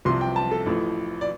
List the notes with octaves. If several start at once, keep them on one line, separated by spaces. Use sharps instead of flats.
C2 C3 F3 C6
G5
A5
A4
A1 A2 F3
D5